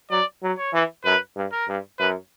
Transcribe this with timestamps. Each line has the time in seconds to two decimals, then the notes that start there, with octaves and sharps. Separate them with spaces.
0.10 F#3 D5
0.43 F#3
0.58 C#5
0.73 E3
1.05 F#2 B4
1.36 G2
1.52 A#4
1.68 G2
1.99 F#2 B4